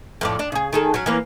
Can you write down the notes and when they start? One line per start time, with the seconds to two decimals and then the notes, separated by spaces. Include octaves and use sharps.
0.21 F2 A2 D5
0.39 D4
0.52 C#3 G#4
0.73 D#3 G#4 A4
0.94 F#3 C#4
1.06 E3 A#3 C#4